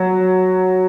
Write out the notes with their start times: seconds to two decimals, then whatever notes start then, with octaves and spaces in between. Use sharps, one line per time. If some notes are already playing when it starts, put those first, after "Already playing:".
Already playing: F#3